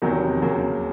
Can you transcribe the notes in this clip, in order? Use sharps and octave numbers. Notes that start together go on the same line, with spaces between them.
F1 E2 C3 D#3 F#3
D#2 C#3 F#3 A#3